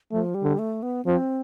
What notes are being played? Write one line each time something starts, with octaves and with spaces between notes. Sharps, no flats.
F3 A3
G3
D3
A3
B3
F3 C4